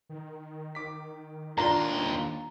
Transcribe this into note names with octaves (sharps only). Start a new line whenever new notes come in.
D#3
D6 B6
D#2 D4 F4 D5 A#5 C6